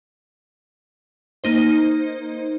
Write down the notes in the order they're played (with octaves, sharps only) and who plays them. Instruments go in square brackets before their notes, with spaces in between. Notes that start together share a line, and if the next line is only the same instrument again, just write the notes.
[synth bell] A#3 D#4 C5